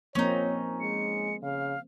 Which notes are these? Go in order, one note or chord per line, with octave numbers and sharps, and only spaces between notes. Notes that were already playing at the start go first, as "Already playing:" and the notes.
F3 A#3 C4 C#4 D#4 C#5
G#3 C#7
C#3 F5